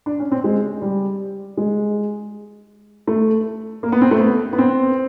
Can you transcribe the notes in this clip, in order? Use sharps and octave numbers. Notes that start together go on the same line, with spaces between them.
D4
C#4
C4
G#3
G3
G#3
A3
A#3
B3
C4
A3
B3
B3
C4